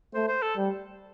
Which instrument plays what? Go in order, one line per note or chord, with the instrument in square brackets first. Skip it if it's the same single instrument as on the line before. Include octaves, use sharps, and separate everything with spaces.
[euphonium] A3 [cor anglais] C5
[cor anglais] C5
A4
[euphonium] G3